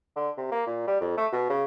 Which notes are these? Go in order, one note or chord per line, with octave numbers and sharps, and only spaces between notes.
D3
C3
A#3
A#2
G3
F2
A3
B2
C#3